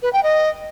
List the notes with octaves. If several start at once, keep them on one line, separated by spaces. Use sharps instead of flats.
B4
G5
D#5